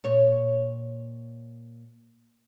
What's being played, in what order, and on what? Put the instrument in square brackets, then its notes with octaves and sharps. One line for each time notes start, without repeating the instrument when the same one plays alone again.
[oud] A#2 C#5